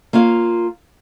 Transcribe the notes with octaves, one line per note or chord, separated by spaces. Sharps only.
A#3 F4 C#5 F5